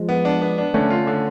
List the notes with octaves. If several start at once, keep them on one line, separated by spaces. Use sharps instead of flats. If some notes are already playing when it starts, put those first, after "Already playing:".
Already playing: F3 G#3
B3
D4
B3
D4
D3 A3 C#4
F4
D3